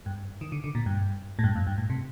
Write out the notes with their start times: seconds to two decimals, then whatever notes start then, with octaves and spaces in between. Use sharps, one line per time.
0.06 G2
0.41 D#3
0.52 D3
0.64 D3
0.75 A#2
0.86 G2
1.39 A2
1.44 G2
1.56 F2
1.67 G2
1.78 A2
1.90 C3